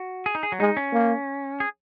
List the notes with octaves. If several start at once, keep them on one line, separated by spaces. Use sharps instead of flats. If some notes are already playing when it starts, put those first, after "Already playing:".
Already playing: F#4
G#4
D#4
G#4
F#3
G#3 D#4
C#4
A#3
G#4